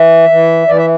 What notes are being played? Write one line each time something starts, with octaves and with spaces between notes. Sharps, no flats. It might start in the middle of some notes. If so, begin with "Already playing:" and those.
Already playing: E3 E5
E3
E3 D5
E5